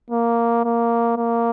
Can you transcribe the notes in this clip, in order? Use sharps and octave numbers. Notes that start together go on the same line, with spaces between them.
A#3
A#3
A#3